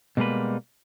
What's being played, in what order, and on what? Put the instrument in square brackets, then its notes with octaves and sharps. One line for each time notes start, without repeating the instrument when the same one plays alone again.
[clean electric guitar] B2 G3 G#3 A#3 B4